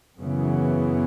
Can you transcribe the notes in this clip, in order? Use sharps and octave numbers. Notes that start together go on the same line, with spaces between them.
F#2 C#3 E3 B3